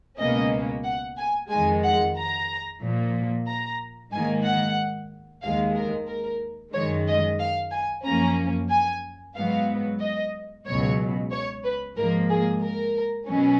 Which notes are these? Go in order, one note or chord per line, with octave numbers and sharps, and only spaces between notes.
C#2 B2 A#3 C#4 D#5
F#5
G#5
F2 D#3 G#3 G#5
F#5
A#5
A#2 F3 A#3
A#5
G#2 D#3 A#3 G#5
F#5
D#2 D#3 G#3 F5
A#4
A#4
F#2 D#3 G#3 C#5
D#5
F5
G#5
F#2 F3 A#3 C#4 A#5
G#5
G#2 F#3 B3 F5
D#5
C#2 B2 F#3 C#5
C#5
B4
G#2 F3 A#3 A#4
G#4
A#4
B2 F#3 C#4